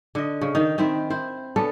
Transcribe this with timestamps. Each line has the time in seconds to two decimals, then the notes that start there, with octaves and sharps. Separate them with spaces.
0.15 D3 D#5
0.41 C#3
0.55 D#3 D#4
0.78 D#3 C4 E4 E5
1.10 E4 C5
1.56 B3 C#4 D4 A4